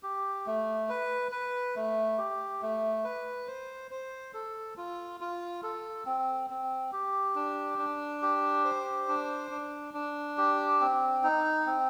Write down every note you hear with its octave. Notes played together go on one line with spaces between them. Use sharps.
G4
A3
B4
B4
A3
G4
A3
B4
C5
C5
A4
F4
F4
A4
C4
C4
G4
D4
D4
G4
C5
D4
D4
D4
G4
C4
D#4
C4